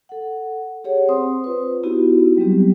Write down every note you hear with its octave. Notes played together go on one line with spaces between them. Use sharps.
A4 F#5
G4 G#4 C#5 F#5
C4 C5 C6 D#6
F4 B4
B3 D#4 E4 F#4 G4
F#3 G3 B3 C4 G4